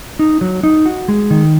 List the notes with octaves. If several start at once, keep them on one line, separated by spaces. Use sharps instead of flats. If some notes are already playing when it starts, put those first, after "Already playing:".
D#4
F#3
D#4
F#4
G#3
D#3